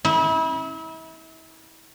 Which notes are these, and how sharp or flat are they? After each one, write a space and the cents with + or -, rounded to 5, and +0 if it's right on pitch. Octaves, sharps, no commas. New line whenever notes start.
E4 -35